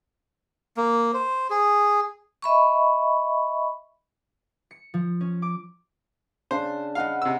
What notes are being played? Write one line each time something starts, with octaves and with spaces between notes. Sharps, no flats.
A#3
C5
G#4
D#5 E5 B5 C#6
C#7
F3
C#4
D6
C#3 D4 C5
D#5 F5 F#5 B5
C3 E6